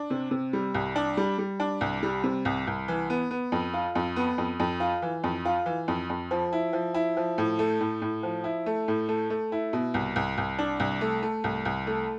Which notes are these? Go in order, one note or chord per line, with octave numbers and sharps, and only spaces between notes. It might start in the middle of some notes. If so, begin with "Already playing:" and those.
Already playing: D4
C3
C3
G3
C2
D4
G3
G3
D4
C2
G3
C3
C2
C2
E3
B3
B3
F2
F4
F2
B3
F2
F2
F4
E3
F2
F4
E3
F2
F2
F3
E4
F3
E4
F3
A2
A3
A2
A2
F3
E4
A3
A2
A3
A3
E4
B2
C2
C2
C2
D4
C2
A3
A3
C2
C2
A3